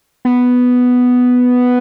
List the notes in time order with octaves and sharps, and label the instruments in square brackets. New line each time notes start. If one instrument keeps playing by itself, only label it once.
[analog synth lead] B3